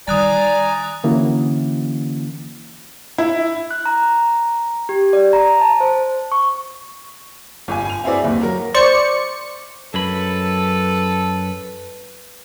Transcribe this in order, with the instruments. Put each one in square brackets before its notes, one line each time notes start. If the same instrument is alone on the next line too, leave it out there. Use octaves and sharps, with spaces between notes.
[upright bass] D#3 G3 [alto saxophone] D5 [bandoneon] G#5 A#5 [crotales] D#6 F#6 A6
[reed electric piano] D3 E3 A#3 C#4 E4 F#4
[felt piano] E4
[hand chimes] F#6
A#5
G4
D5
A#5
A5
C5
C#6
[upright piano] G1 G#5
G#5 F7
C4 E4 F#4 G#4 B4 D5
F#1 D#2
F#3 A#4
[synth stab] C5 D5 C#6 C#7
[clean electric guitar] F#2 F#3 B5 [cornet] A4 [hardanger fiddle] B4